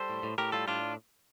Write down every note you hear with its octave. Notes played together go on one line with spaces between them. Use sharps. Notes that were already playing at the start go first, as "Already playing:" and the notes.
Already playing: G3 A4 C5
A2
A2
A2 G4 A#4
G3 F4 A4
A2 D4 F4